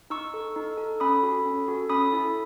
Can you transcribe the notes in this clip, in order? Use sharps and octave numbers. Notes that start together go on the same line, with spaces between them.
D#4 C#6 E6
A4
D#4
A4
C#4 B5 D#6
F#4 A4
C#4
F#4 A4
C#4 B5 D#6
E4 A4